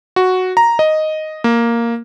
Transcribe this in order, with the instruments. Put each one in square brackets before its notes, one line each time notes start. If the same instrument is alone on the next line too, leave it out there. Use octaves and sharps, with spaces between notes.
[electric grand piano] F#4
A#5
D#5
A#3